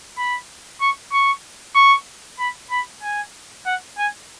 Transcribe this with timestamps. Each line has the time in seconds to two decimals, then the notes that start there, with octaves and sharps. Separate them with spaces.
0.17 B5
0.81 C#6
1.12 C#6
1.75 C#6
2.39 B5
2.70 B5
3.02 G#5
3.65 F#5
3.98 G#5